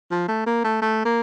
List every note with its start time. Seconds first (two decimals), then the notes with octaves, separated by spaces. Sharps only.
0.11 F3
0.28 A3
0.46 A#3
0.64 A3
0.82 A3
1.05 A#3